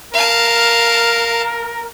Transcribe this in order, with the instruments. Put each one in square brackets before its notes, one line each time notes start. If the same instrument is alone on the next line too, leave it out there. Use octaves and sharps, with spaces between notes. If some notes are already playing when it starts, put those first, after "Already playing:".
[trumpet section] A#4 [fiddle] F5 A5